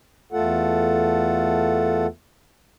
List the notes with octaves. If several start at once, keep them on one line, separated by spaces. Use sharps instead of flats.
E2 A3 F4 A4 F#5